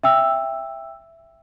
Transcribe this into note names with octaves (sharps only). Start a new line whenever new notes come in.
E5 G5 E6